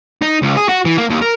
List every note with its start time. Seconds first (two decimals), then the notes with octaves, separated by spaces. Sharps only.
0.22 D#4
0.42 C#2
0.57 G#4
0.69 F#4
0.85 E3
0.98 A#3
1.10 D#2
1.22 A#4